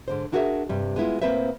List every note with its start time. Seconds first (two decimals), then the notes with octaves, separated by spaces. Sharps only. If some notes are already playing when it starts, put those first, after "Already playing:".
0.08 G#2 D3 C5
0.32 D4 E4 F#4 G#4 A#4 E5
0.69 G2 C3 G3
0.96 G#3 B3 E4 F4
1.22 A2 A#3 C4 B4 C5 E5